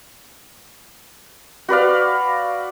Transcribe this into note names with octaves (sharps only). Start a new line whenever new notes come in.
F#4 B4 D5 F5